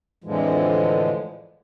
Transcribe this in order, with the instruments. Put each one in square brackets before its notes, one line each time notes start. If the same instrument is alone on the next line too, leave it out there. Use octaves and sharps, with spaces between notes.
[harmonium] F2 A2 D3 E3 F3 G#3